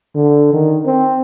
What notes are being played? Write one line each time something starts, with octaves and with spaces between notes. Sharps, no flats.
D3
D#3
C4